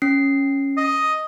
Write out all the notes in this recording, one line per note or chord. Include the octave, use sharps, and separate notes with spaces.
C#4 C7
D#5